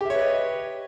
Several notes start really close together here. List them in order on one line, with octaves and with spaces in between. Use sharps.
G4 E5 C#5 B4 D#5